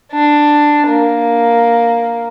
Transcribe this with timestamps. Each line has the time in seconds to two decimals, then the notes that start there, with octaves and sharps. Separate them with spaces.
0.12 D4
0.88 A#3